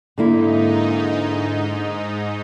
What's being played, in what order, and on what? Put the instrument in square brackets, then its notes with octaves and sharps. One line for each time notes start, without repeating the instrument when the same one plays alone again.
[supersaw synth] G#2 D#4 [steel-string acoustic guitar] D3 A#3 E4